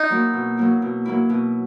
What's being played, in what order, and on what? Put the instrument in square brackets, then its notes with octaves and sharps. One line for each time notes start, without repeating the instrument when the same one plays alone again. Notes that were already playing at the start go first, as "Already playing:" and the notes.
Already playing: [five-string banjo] D#4
[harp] F#3 A#3 E4
B2
F#3 A#3 E4
B2
F#3 A#3 E4
B2